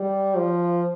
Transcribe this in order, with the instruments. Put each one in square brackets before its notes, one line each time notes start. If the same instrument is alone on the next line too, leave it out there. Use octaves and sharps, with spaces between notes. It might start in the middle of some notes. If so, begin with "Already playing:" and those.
Already playing: [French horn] G3
F3